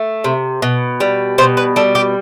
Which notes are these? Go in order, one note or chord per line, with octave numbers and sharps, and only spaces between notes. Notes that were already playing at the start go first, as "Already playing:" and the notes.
Already playing: A3
C3
B2
G3
B2 C5
B4
G3 A4
G4